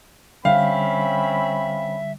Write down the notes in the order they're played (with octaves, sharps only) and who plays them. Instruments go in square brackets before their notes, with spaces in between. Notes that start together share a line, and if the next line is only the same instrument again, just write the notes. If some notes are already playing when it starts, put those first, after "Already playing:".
[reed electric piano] D3 G3 G5 [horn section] C4 C#4 B5 [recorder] E5 [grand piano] F5